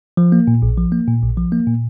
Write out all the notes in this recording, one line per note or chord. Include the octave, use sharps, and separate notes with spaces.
F3
A#3
A#2
A#1
F3
A#3
A#2
A#1
F3
A#3
A#2